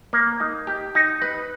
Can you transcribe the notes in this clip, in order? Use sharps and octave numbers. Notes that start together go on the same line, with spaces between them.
A#3
D#4
G4
D#4
B4